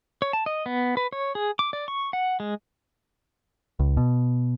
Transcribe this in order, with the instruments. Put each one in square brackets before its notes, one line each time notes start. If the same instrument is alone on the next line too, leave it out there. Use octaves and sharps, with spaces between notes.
[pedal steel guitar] C#5
A5
D#5
B3
B4
C#5
G#4
D6
D5
C#6
F#5
G#3
[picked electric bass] C#2
B2